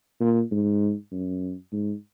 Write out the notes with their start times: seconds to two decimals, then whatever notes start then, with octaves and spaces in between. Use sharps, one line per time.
0.20 A#2
0.51 G#2
1.11 F#2
1.72 G#2